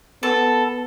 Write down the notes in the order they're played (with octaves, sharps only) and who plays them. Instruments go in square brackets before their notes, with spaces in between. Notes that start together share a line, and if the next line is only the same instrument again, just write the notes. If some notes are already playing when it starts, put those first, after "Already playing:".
[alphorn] B3 [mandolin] A4